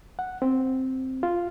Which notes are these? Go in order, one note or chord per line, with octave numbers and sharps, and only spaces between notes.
F#5
C4
F4